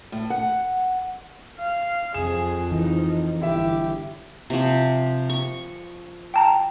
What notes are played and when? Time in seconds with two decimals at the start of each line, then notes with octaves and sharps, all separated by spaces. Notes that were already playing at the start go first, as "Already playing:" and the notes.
0.12 A2
0.30 F#5
1.58 F5
2.14 F2 F3 G#4 E7
2.72 E3 D#4
3.42 G1 E4 G4 E5
4.50 C3 F3
5.29 C#6
6.34 G5 A5 A#5